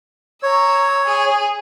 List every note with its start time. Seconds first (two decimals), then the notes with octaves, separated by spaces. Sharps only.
0.43 C#5 A#5 E6
1.04 G#4